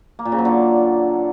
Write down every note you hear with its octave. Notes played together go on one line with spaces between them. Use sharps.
A#3
A#2
C#3
F#3
D3